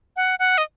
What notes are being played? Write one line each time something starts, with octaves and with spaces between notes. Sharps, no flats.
F#5
F#5
D#5